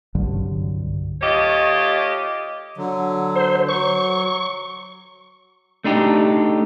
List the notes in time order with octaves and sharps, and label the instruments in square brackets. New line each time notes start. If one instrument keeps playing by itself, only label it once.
[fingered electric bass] C2 G2 D3 F#3
[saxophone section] A3 F4 G4 C#5 D#5
[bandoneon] D3 F#3
[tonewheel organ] C5
[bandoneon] F#3 [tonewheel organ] C#6
[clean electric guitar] A3 D4 D#4 G4